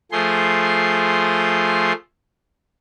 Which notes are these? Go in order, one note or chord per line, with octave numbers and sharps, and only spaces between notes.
F3 A3 G#4 C6